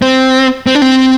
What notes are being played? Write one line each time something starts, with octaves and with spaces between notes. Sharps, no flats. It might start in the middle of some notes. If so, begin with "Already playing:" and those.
C4
C4
D4
C4